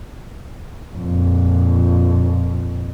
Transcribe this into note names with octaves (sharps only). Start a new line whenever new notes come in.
F2 A#2